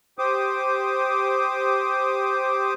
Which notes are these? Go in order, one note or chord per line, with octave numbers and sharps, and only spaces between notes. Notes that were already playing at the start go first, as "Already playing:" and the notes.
G4 C5 D6 D#6